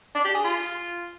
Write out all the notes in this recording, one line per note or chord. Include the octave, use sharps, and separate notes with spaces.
D4
G4
G#4
F4